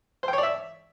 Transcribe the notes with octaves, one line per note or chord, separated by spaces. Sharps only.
C5
G5
C#5
D5
E5